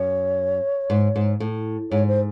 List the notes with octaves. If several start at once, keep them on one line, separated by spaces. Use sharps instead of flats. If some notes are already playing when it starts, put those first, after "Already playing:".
Already playing: F#2 C#5
G#2
G#2
A2
G#2 C#5
C5